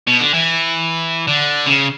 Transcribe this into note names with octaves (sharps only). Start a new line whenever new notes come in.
B2
D3
E3
D3
C#3